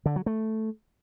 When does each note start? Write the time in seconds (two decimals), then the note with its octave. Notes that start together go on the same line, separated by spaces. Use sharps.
0.06 D3
0.16 F#3
0.26 A3